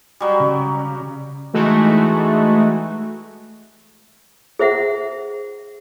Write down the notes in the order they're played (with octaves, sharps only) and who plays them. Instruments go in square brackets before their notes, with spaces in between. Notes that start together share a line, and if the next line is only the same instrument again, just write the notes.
[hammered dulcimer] F#3 G3
[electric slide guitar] C#3
[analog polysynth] E3 G#3 A3 D#4 F#4
[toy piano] G#4 C5 E5 F#5